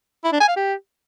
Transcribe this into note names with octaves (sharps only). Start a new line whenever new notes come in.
E4
D4
G#5
F5
G4